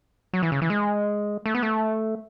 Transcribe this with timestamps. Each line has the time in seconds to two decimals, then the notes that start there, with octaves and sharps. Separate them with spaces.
0.33 F#3
0.43 E3
0.52 C#3
0.62 E3
0.70 G#3
1.46 A3
1.55 B3
1.63 A3